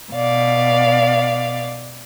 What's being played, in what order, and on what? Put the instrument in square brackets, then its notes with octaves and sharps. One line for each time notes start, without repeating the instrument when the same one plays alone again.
[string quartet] B2 D5 F5